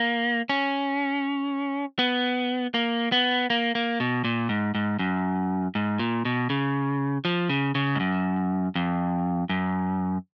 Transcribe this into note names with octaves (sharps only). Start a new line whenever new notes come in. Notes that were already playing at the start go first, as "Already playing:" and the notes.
Already playing: A#3
C#4
B3
A#3
B3
A#3
A#3
B2
A#2
G#2
G#2
F#2
G#2
A#2
B2
C#3
F3
C#3
C#3
G#2
F#2
F2
F#2